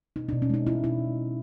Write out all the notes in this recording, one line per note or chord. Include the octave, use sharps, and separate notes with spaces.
B2 D#4
B2 D4
C#4
G#3 D#4
G#3 E4
B2 E4